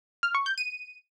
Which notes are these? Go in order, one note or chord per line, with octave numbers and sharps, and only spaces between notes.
F6
C#6
G6
D#7